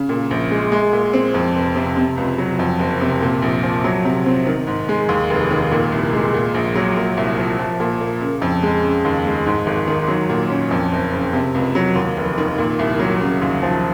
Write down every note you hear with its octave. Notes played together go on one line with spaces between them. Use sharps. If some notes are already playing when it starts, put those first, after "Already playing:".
Already playing: C#3
A#2
A#1
G#3
G#3
A#2
C4
F2
F1
C3
C3
C#2
F#3
F2
F#1
C3
A#2
A#1
F3
F#3
C3
C4
D#3
G#2
G#3
D#2
F1
D#3
A#2
C2
G#3
A#2
A#1
F#3
A#2
C2
F3
F3
A#2
A#3
C#3
F2
G#3
C#3
D#2
G#3
G#2
G#1
D#3
F#3
A#2
C#4
F2
F#1
C#3
C3
C#2
F#3
D#2
F1
D#3
A#2
C2
F#3
C#3
D#2
F3